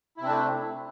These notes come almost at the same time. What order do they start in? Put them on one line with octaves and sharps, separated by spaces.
E4 C3 C4 D4 A3